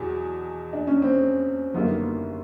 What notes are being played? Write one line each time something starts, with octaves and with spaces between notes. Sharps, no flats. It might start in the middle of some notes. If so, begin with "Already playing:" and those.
Already playing: E2 B2 F#3 G4
D4
C#4
C4
G1 F#2 D#3 G3 A#3 B3